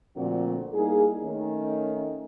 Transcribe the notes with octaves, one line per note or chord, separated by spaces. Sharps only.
A#2 D3 F3 A3 C4 F#4
G3 A#3 D#4 E4 G#4
D#3 A3 C#4